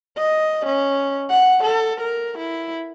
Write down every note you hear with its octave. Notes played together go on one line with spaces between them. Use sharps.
D#5
C#4
F#5
A4
A#4
E4